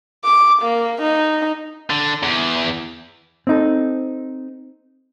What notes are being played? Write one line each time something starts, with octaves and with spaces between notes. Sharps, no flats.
D6
A#3
D#4
D3
E2
C4 D#4 A4